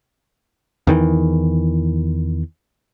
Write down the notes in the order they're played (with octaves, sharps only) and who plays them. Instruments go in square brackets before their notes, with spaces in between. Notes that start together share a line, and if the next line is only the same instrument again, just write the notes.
[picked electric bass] E2 D#3 E3